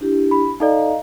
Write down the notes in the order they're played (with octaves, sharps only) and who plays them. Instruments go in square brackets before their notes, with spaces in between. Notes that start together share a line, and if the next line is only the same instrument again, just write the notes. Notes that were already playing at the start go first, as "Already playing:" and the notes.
[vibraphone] D4 E4 G4
[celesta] B5
[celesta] D#4 A4 D5 [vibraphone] D#5 F5 A#5